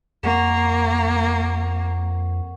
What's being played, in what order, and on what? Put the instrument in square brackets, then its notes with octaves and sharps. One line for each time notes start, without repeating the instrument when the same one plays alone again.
[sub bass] F2 [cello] A#3 [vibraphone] A#4 F#5 C#6